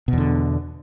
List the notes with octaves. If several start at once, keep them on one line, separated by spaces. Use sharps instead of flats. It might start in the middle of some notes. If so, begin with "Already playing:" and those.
E2 B2 D3